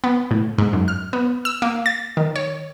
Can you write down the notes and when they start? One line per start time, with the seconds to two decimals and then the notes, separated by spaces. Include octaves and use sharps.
0.04 B3
0.31 A2
0.58 G#2
0.73 F#2
0.88 F6
1.13 B3
1.45 E6
1.62 A#3
1.86 A6
2.17 D#3
2.36 C#5